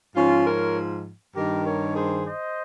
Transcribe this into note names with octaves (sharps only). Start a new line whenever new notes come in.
G#2 F3 C#4 F4
A#4 C#5
G2 D#3 G4 A#4
A#4 C#5
G#4 C5
C5 D#5